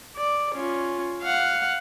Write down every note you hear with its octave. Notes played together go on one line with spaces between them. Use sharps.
D5
C#4 F4
F5 F#5